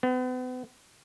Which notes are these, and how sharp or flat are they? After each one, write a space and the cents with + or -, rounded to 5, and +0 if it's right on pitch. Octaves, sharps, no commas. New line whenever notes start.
B3 +40